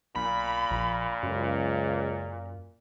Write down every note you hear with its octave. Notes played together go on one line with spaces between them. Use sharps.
B1 A#2 B5
A#1
C#2 F#2